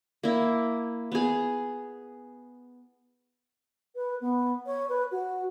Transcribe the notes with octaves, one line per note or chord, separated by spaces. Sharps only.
A#3 E4
B3 G#4
B4
B3
C#5
B4
F#4